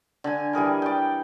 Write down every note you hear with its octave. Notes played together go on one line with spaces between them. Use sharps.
D3 G#5
E3 G3 G#4 A#4
D5 G5